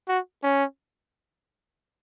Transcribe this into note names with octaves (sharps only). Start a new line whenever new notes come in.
F#4
C#4